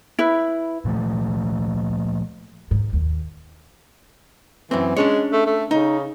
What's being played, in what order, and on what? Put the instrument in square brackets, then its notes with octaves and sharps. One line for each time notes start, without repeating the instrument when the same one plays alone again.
[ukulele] E4 B4
[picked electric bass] A#2 F3 A3
[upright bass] G#2
D#2
[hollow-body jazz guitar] F#2 C4 [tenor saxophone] E3
[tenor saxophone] G#3 [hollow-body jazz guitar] C#4 D4 C#5
[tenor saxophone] A3
A3
[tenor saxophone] C#3 [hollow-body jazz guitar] D#4